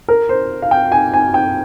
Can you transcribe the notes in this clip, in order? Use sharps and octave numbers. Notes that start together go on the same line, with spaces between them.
A#4
C5
F5
G5
G#5
G#5
G5